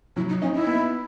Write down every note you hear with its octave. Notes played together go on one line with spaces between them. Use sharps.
F#3 E4
D#4
C#4 D#4
E4
B3